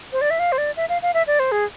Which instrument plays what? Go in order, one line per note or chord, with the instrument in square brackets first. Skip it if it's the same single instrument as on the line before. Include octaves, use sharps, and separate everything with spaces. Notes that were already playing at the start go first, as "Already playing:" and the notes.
[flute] C5
D5
E5
F5
C5
D5
E5
F5
F5
E5
D5
C5
G#4